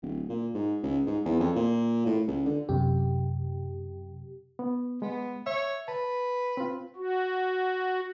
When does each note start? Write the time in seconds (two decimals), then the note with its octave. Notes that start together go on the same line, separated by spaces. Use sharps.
0.02 D1
0.29 A#2
0.54 G#2
0.83 C#2
1.06 G#2
1.25 E2
1.40 F2
1.56 A#2
2.06 A2
2.27 C#2
2.46 D3
2.69 F#2 C3 G4
4.59 B3
5.02 G#3 B3
5.46 C#5 E5
5.88 B4 A5
6.57 C4 F4
6.96 F#4